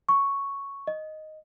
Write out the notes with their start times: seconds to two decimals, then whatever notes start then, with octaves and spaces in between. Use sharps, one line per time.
0.09 C#6
0.87 D#5